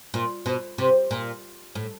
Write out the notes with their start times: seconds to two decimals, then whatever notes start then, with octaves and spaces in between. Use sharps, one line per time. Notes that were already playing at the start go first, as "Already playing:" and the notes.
0.14 A#2
0.46 B2
0.78 C3
1.11 A#2
1.75 A2